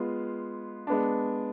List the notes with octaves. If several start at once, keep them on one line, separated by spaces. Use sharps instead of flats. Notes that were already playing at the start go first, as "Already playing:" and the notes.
Already playing: G#3 B3 F4
G#3 B3 D4